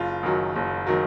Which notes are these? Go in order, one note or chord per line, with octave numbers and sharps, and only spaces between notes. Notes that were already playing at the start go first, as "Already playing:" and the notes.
Already playing: F#1 F4
F#2 D#3 F#3
F#1
D#3 F#3